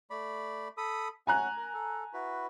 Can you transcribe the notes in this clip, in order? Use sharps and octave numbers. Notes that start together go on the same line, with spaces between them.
A3 D5 B5
A4 B5 D#6
C#4 F#5 G#5 A#5 F#6
A#4
A4
E4 F#4 B4